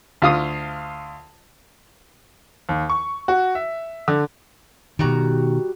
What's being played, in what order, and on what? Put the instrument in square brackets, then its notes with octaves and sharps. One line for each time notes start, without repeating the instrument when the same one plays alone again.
[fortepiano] D2 F4 D#6
[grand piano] D#2
C#6
F#4
E5
D3
[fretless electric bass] B2 D#3 [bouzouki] G3 F#4 A#5